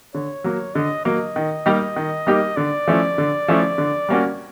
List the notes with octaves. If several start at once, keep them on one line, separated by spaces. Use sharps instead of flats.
D3 C#5
F#3 A#3
D3 D#5
F#3 A#3 D#5
D#3
G3 A#3 D#4 G4
D#3
G3 A#3 D#4 G4
D3 D5
F3 A3 C#4 E4
D3
F3 A3 C#4 E4
D3
G3 A#3 C#4 F#4